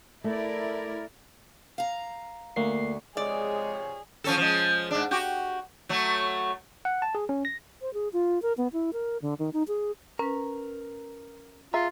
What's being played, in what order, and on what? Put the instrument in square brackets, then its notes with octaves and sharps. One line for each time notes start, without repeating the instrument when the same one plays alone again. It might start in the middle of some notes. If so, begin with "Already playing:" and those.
[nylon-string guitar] A3 [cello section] E4 A#4 D5
[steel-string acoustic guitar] F5 A#5
[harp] D2 [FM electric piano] A#3 C7
[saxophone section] C3 F3 C#5 [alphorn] G#3 [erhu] G#4 [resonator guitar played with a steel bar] D5
[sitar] F3 C#4 A4
F3 G#3
G#2 D4
F#4 G4
F#3 A3
[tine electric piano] F#5
A5
G#4
C#4
A#6
[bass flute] C5
G#4
F4
A#4
B3
E4
A#4
D3
D#3
D#4
G#4
[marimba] C#4 B4 [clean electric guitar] A#4 A#5
[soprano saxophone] F4 [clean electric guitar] G#4 E5 A#5